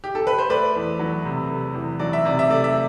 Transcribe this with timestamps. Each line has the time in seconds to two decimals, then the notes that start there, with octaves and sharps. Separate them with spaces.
0.04 G4
0.15 A4
0.27 B4
0.38 C5
0.50 A3 B4 D5
0.75 E2
0.99 F#3
1.25 C3
1.50 A3
1.75 E2
1.99 F#3 D5
2.13 E5
2.25 C3 D5
2.39 E5
2.50 A3 D5
2.64 E5